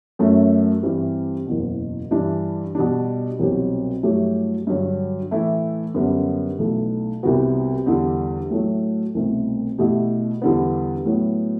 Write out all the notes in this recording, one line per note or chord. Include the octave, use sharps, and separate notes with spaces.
F#2 F#3 A3
G2 E3 G3 C4 G4
F#1 E2 B2
G2 E3 G3 D4
B2 G3 D4
C2 B2 F#3 C4 G4
G2 F#3 A3 E4 G4
G2 D3 F#3
A2 E3 A3 E4
F#2 D3 G3 B3
B1 B2 A3 E4 A4
C2 C3 G3 B3 F#4
E2 D3 G3
A2 F#3 A3
C2 B2 A3 C4
B2 A3 E4 G4
E2 D3 G3 B3
A2 F#3 B3